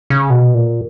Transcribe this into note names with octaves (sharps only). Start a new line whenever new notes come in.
C#3
B2
A#2